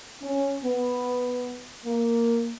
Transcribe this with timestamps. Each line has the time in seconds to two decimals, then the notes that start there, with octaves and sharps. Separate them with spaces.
0.22 C#4
0.64 B3
1.86 A#3